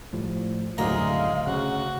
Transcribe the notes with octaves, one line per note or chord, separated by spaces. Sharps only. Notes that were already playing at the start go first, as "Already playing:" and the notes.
A2 F3 G3
F#1 D2 A2 F#3 G#3 F5 A#5
C#3 F#4